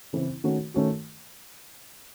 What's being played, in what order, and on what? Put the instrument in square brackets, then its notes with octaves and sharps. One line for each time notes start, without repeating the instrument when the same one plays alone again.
[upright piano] C#3 E3 C4 E4
D#3 A3 C#4 F#4
D#3 A3 C#4 F#4